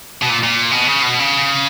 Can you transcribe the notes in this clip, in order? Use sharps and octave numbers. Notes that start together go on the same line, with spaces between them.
B2
A#2
A#2
B2
C#3
B2
C#3